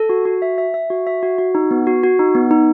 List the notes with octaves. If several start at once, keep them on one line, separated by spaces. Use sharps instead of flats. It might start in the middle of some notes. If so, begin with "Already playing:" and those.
Already playing: A4
F#4
F#4
E5
E5
E5
F#4
E5
F#4
F#4
D#4
B3
F#4
F#4
D#4
B3
D#4